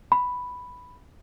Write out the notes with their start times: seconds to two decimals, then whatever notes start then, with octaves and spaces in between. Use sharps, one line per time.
0.12 B5